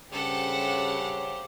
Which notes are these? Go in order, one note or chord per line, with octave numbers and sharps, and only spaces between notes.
G2 C#3 G4 A4 C5 F#5